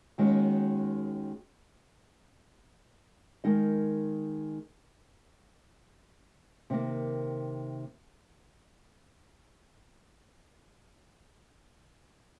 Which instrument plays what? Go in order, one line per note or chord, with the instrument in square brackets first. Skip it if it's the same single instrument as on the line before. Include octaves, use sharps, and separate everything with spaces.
[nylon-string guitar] D#2 D#3 G#3 C#4 F#4
D#3 G#3 D#4 A#4 D#5
C3 D#3 A#3